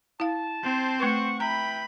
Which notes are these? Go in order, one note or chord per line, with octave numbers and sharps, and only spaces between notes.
E4 F5 A5
C4 C5
A3 B4 F#5 C#6
E4 B4 G5 A#5 B5